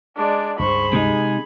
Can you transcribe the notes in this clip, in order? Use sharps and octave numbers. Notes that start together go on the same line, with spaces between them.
G#3 D4 D5
C#2 G2 D4 G#4 C5 B5 C#6
C3 G#3 D#4 G#5